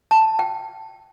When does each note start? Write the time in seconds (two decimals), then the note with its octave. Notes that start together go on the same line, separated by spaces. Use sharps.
0.11 A5
0.39 G5